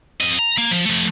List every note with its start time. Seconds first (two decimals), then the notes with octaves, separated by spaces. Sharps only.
0.20 F2 D#5
0.39 A#5
0.58 A#3
0.71 F3
0.86 F3 A3